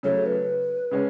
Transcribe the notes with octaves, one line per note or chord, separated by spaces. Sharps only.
C#3 F#3 A3 C#5
B4
C#3 G#3 C#4